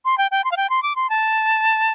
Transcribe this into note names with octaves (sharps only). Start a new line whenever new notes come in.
C6
G5
G5
C6
F5
G5
C6
D6
C6
A5